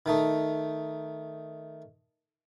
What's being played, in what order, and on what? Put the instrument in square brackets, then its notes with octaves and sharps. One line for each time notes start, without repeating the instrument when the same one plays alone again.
[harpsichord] D#3 A3 D#4